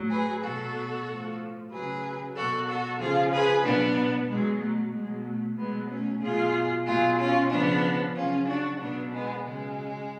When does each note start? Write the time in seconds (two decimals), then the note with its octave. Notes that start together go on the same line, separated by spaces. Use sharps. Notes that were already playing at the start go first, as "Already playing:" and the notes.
Already playing: A2 F#3
0.10 G#4 B4
0.43 B2 F#3 F#4 A4
1.06 A2 F3
1.71 C#3 F#3 G#4 B4
2.36 B2 F#3 F#4 A4
2.68 F#4 A4
3.00 C#3 F3 F4 G#4
3.32 G#4 B4
3.65 B2 F#3 B3 D4
4.28 B2 F#3 G#3
4.61 A3
4.93 B2 F#3 G#3
5.26 A3
5.58 B2 F#3 G#3 B3
5.90 A3 C#4
6.22 B2 F#3 F4 G#4
6.87 B2 F#3 F4 G#4
7.19 C#4 F4
7.51 C#3 F3 B3 D4
8.15 C#3 F#3 C#4 F4
8.48 D4 F#4
8.80 B2 F#3 B3 D4
9.13 G#3 B3
9.44 C#3 F#3 G#3